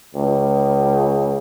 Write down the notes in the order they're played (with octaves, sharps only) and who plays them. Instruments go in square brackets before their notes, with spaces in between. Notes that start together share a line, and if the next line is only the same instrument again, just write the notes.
[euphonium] C#2